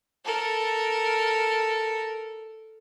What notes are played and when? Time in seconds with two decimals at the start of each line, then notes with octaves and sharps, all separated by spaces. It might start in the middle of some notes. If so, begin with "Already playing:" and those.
0.25 A4 A#4